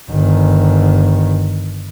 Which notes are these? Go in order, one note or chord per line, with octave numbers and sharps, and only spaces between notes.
G1 D#3